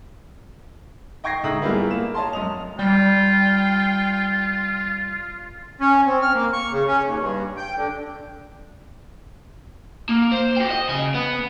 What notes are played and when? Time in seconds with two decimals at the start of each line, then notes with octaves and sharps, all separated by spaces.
1.24 D#5 G5 C#6 G#6 A#6 C7
1.43 G#2 D3 E5 D#6 F#7
1.62 G3 A#3 B3 E4 F4 G#4
1.91 A#3 E7
2.15 C#5 D#5 A5 C6
2.33 F#2 D#6 F7
2.79 G3 F4 G5
5.81 C#4
6.06 C4
6.22 F6
6.34 A#3
6.53 C#6
6.72 C#3
6.88 C#4
7.04 D#2
7.19 G2
7.57 G5
7.77 D3
10.09 A#3
10.32 C5
10.57 F#4 G5
10.71 D#5
10.89 C#3 G#5
11.14 B3